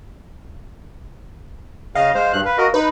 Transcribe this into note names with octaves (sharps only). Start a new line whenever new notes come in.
C#3 D#5 F5
G#3 C5
G2 F#6
B4
F#4 A#4 D#5
D#4 B4